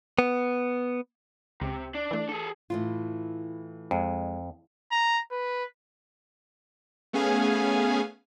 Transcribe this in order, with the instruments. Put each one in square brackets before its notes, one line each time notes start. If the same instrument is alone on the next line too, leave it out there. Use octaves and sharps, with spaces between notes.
[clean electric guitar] B3
[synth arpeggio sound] C#2 [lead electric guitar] C3
[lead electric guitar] D4
[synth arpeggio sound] E3 A3
[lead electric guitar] G#4 A4
[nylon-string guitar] A2 E3 F4
[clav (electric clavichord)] F2 [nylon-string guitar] G#3
[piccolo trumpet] A#5
B4
[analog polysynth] A3 B3 C#4 G#4 F5 G#5